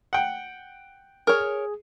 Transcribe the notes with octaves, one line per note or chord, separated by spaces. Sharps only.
F#5 G5
G#4 A#4 C#5